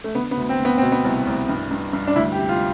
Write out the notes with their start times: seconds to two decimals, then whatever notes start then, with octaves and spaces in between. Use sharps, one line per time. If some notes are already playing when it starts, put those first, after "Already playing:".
0.04 A3
0.15 D3 B3
0.31 B3
0.37 D2
0.49 C4
0.59 D2
0.65 B3
0.78 B2 C4
0.92 B3
1.04 C2
1.27 C2
1.49 G2
1.71 G2
1.93 G2
2.07 D4
2.16 D2 E4
2.32 G4
2.37 C3
2.49 F4